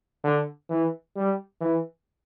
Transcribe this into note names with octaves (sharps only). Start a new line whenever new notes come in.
D3
E3
G3
E3